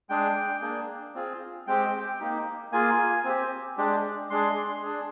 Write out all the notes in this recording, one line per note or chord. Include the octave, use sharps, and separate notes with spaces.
G#3 D4 G#4 G5
A#3 D4 G#4
C4 F4 G#4
G#3 C4 G4 G5
A#3 D#4 G4
A#3 F4 G#4 G#5
C4 G4
G#3 D4 G4
G#3 D4 G#4 C6
D4 G#4